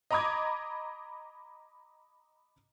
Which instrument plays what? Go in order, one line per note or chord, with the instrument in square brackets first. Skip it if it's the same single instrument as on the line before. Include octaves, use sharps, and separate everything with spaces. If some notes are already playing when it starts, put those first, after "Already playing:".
[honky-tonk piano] D#5 A#5 B5 D6 D#6 G#6